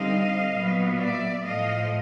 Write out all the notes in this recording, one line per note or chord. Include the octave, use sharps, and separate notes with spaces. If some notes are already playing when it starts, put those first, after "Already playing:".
Already playing: D3 G3 C4 D#4 D#5 F5
A#2 F#3 B3
D5 E5
A2 F3 A3 D#5 F5